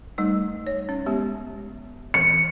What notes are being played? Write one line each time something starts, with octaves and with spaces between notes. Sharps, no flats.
G3 A3 D#4
C#5
C#4
G#3 B3 G4
E3 C#7